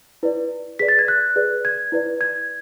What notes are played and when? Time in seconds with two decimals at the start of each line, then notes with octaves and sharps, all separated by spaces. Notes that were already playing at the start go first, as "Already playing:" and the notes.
0.23 E4 B4 D5
0.79 G#4 B4 D5 B6
0.88 A6
0.99 G#6
1.08 F#6
1.36 G#4 B4 D5
1.65 G#6
1.92 E4 B4 D5
2.21 G#6